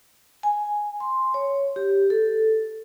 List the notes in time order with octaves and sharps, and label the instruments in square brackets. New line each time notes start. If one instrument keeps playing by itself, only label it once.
[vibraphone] G#5
C6
C#5
G4
A4